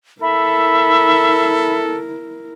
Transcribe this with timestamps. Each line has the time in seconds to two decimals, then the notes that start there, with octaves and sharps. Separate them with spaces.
0.22 E4 A4 A#4 E5 B5